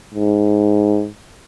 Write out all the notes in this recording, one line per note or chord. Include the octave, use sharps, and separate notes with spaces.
G#2